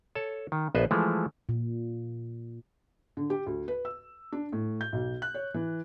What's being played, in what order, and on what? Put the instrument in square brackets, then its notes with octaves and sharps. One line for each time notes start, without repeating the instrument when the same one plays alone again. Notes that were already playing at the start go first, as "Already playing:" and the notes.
[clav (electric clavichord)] A4 C#5 A5
D#3
A#1 B3 B4 C5 D#5 E5
E3 F3 G#3 A3
[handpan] A#2
[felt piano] D3
G4
D2
B4
E6
D4
A2
G6
B1
F#6
C#5
E3